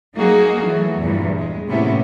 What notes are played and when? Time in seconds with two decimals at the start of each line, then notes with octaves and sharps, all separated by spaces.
0.15 F#3 A#3 D#4 F#4 G#4
0.64 E3 F#3 A3
1.00 E2 G2 A#2 E3
1.38 G#3
1.67 A2 C3 A#3 B3 C#4 E4